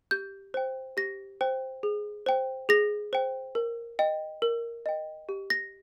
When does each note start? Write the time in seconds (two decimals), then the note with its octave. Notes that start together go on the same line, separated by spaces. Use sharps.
0.11 G4 G6
0.54 C5 G5
0.97 G4 A#6
1.41 C5 G5
1.83 G#4
2.26 C5 G5
2.69 G#4 A#6
3.13 C5 G5
3.55 A#4
3.99 D#5 G5
4.42 A#4
4.86 D#5 G5
5.29 G4
5.50 A#6